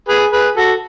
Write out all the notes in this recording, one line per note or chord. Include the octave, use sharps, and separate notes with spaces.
G#4 B4
G#4 B4
F#4 A4